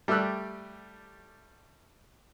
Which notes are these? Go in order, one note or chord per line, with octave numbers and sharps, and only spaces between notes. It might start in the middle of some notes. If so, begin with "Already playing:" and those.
G3 A3 G4 E6 F#6